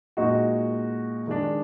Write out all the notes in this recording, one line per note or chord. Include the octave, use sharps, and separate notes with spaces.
A#2 G#3 D#4 F#4
D#3 G#3 D4